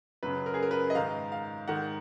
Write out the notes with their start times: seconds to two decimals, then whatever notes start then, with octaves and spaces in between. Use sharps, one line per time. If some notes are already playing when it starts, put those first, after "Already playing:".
0.23 F#2 C#3 B4
0.46 A#4
0.54 G#4
0.63 A#4
0.71 B4
0.90 D#5
0.95 G#2 D#3 F5
1.32 F5
1.68 G#2 D#3 F#5